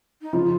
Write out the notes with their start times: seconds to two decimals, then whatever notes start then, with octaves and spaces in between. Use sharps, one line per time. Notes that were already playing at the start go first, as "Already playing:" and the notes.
0.21 D#4
0.33 C#3 F3 F4